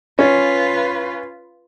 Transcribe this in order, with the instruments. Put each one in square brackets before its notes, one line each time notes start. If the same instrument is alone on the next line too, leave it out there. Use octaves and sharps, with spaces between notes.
[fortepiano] C#4 [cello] F4 B4